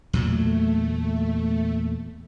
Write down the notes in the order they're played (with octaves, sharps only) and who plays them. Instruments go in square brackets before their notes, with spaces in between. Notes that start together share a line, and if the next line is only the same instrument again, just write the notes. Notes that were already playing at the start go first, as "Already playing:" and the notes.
[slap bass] E2 A#2 F#3 [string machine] A3